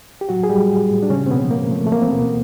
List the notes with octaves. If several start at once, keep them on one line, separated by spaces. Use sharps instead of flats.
G4
A2 F#3 F#4
G#4
A2 G3 G4
A2
A2
D4
C#3 G#3 C#4
C4
B2 F3 B3
G#3 A#3
F3 A3
A3
E3 A#3
C4
D2 B2 B3